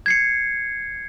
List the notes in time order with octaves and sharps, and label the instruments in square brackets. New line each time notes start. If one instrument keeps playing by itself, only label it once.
[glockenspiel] G#6 C7 C#7